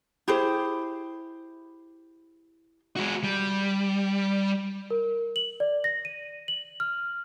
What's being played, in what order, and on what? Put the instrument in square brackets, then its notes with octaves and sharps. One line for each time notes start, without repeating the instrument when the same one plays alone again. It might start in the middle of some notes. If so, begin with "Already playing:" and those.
[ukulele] E4 G4 G#4 C5
[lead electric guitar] G#3 F#4
G3
[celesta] A#4
F#7
D5
A#6
D#7
F#7
F6